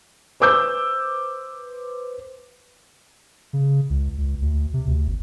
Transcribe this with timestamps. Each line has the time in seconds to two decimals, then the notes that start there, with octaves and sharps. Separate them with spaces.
0.40 B4 C5 D6 E6 G6
3.53 C#3
3.90 C#2
4.18 C#2
4.42 D2
4.73 C3
4.87 D2
5.08 G1